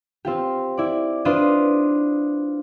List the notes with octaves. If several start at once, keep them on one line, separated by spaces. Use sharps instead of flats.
C4 F4 G4
E4 D5
D4 F4 B4 C5 D#5